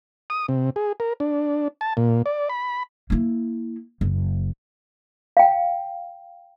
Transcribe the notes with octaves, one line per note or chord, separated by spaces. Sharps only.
D#6
C3
G#4
A#4
D4
A5
A#2
D5
B5
A#3 E4
F#1
F5 G5